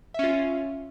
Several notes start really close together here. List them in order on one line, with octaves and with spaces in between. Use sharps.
E5 C#4 F4